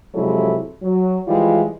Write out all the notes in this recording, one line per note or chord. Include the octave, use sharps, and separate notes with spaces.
C3 F3 F#3 G#3 E4 A4
F#3
E3 F3 G3 G#3 E4 F4